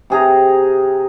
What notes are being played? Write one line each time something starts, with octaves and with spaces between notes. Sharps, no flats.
C3 G#4 A#5